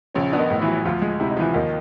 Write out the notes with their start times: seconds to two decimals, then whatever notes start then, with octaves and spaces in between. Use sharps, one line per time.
0.14 A#1 C#3 C#4
0.33 B3 D4
0.39 D#3 D#4
0.50 A2
0.62 E3 E4
0.67 F#3
0.85 D2 F3 F4
1.02 G#3
1.20 C3 E4
1.30 D#4
1.37 E3 F3 E4
1.54 D#2 D#3 D#4